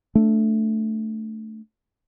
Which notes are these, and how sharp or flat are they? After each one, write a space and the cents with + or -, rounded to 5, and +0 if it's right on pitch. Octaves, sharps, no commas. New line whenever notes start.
A3 +0 D4 -5